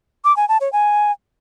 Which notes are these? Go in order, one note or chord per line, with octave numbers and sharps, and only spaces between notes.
D6
G#5
A5
C#5
G#5